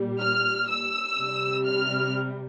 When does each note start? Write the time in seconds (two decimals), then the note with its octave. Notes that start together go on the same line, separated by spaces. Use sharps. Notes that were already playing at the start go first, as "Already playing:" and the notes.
Already playing: A#2 G3
0.21 F6
0.69 E6
1.17 C3 G3
1.66 F6